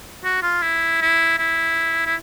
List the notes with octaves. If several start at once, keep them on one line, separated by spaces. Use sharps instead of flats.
F#4
F4
E4
E4
E4
E4